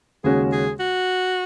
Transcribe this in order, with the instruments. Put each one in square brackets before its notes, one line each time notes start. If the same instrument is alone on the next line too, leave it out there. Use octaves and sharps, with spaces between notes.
[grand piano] D#2 C#3 G#3 C#4 F#4 [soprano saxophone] G#4
[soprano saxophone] G#4
F#4